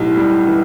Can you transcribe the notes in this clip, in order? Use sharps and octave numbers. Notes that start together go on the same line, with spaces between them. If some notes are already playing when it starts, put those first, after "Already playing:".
Already playing: B1 A2 E4 G4
G3
E3